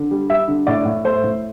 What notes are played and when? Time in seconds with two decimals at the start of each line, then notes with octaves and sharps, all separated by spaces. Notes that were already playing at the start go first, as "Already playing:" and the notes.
Already playing: D3
0.11 G3
0.29 G3 E5
0.48 D3
0.67 A2 D5
0.86 A2
1.04 A3 C5
1.24 A2